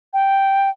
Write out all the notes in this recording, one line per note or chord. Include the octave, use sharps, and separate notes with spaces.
G5